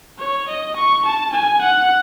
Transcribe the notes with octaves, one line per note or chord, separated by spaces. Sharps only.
C#5
D#5
C#6
A5
G#5
F#5